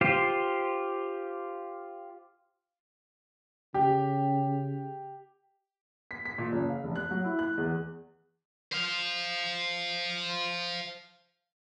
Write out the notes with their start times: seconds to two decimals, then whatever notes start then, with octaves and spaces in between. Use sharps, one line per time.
0.01 F4 G4 C5
3.74 C#3 G4
6.11 B6
6.25 B6
6.38 A#2
6.52 F#1
6.70 F5
6.84 F1
6.96 F#6
7.11 F#3
7.24 E4
7.39 F#6
7.58 E2
8.73 C5 F5